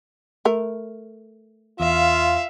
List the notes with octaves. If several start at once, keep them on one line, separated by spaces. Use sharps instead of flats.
A3 A#4
E2 F4 E5 F5